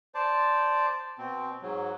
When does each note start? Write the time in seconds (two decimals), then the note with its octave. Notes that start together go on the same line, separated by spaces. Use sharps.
0.15 C5 D5 A5
1.18 B2 C4
1.62 G#2 F#3